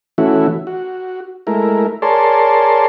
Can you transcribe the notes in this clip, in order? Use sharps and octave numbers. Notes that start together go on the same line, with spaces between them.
E3 A3 C#4 E4 F#4
F#4
G#3 A3 E4 A#4
G#4 A#4 C#5 D5 A5 C6